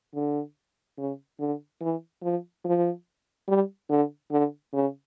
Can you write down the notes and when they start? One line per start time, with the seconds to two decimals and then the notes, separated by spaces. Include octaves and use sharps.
0.14 D3
0.98 C#3
1.40 D3
1.81 E3
2.23 F3
2.64 F3
3.48 G3
3.89 D3
4.31 D3
4.73 C#3